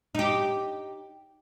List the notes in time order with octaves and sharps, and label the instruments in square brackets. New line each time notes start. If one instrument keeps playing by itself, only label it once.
[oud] D#4 G4